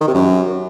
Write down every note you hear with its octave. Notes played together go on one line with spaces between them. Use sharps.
D#3
C3
F#2